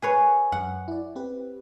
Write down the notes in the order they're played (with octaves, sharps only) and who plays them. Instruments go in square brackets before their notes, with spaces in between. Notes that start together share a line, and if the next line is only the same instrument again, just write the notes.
[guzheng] G#4 B4 C#5
[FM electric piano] F#2 [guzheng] F#5
[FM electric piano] E4 D5
C4 G4 B4